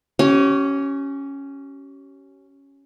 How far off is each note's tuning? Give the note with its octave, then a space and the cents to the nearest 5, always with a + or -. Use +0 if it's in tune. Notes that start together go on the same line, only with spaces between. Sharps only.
C#4 +0 G4 -40